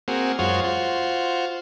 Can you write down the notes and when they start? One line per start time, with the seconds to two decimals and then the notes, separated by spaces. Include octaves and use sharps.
0.08 A#3 C4 F#4 G#4
0.39 F#2 G#3 F4 F#4 C5 C#5
0.64 F4 F#4 C5